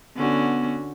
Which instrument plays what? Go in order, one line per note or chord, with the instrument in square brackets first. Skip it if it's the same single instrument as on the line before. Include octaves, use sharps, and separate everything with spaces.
[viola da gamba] D3 C#4 F#4 [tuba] B3